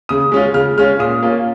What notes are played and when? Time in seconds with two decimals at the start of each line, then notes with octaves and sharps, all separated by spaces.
0.09 C#3 D#6
0.32 G#3 C#4 F4
0.54 C#3 F6
0.78 G#3 C#4 F4 F6
0.99 A#2 D#6
1.22 A#3 C#4 F4